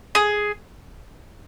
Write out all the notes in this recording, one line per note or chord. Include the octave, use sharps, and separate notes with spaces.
G#4